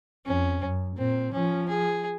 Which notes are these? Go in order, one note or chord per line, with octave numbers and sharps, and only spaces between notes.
F2 C#4
F#2
A#2 C4
F3 C#4
G#4